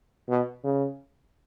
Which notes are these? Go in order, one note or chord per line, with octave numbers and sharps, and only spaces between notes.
B2
C#3